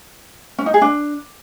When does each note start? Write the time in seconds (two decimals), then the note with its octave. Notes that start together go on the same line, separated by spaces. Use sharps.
0.59 C#4
0.66 D#4
0.74 G#4
0.82 D4